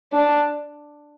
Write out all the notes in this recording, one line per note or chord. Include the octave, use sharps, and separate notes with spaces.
D4